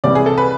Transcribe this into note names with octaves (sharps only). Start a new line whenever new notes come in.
C2 C3 E3 G3 D5
G#4
A4
B4